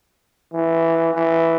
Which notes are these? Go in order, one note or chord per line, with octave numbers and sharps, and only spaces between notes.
E3
E3